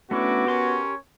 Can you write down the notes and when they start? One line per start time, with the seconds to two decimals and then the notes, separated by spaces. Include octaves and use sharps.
0.11 A3 B3 C#4 D4 E4 F#4 C#6 D6
0.47 C#4 G4 A#4 C#5 C6 D6